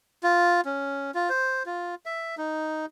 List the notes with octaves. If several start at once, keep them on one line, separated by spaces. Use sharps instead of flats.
F4
C#4
F4
C5
F4
E5
D#4